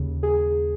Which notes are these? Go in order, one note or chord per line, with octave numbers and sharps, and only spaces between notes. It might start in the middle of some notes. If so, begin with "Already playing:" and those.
Already playing: D#2 C#3
G#4